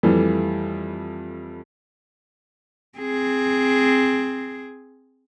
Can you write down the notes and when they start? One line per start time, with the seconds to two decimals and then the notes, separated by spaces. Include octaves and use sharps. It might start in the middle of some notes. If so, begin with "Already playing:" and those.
0.03 F2 E3 G3 A3
2.98 C4 G#4